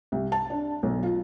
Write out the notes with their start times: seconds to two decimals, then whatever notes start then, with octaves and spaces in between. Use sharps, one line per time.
0.12 C2
0.32 A5
0.50 D4
0.83 B1
1.03 F4